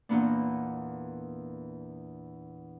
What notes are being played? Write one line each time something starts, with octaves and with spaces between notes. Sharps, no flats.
E2 A#2 A#3 B3 D4